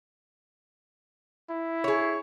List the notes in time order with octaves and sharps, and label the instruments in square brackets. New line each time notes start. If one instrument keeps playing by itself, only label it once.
[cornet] E4
[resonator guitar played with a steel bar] G#4 C#5